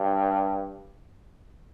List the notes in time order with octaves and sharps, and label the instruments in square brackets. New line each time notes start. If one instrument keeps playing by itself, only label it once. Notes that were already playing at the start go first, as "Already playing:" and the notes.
Already playing: [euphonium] G2